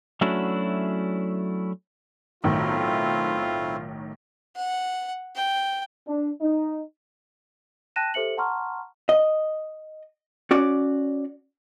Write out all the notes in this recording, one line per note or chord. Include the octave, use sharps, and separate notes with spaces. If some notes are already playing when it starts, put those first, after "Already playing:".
F#3 A3 C#4 D4 E4 F#4
B1 A2 D#3 A3 C4 E4 F4
F#5
G5
D4
D#4
G5 A5 F#6 A#6 D#7 E7
G4 A4 C5 E5 C#7 F#7
F#5 A5 A#5 C6 C#6 F6
D#5
C#4 F#4 D5